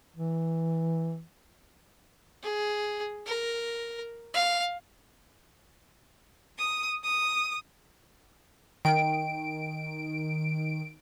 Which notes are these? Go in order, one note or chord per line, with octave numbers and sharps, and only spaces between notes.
E3
G#4
A#4
F5
D#6
D#6
D#3 G5 D7